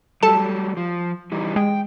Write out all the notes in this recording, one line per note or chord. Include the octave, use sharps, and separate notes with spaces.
F#3 G3 A4 A5
F3
E3 G3 D#4
G#3 G5